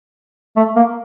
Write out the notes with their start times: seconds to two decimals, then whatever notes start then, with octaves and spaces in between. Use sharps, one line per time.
0.56 A3
0.76 A#3